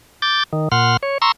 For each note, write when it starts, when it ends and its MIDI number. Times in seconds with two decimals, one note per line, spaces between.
0.22 0.43 86
0.22 0.43 91
0.22 0.43 93
0.53 0.68 51
0.72 0.97 46
0.72 0.97 78
0.72 0.97 84
0.72 0.97 89
1.03 1.18 73
1.22 1.32 82
1.22 1.32 84
1.22 1.32 85
1.22 1.32 88